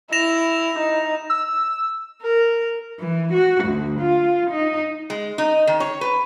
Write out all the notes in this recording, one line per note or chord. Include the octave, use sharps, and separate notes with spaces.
E4 A#6 E7 F7
D#4
E6
A#4
E3
F#4
D2
F4
D#4
G#3
D#4
D#3
C#5
B4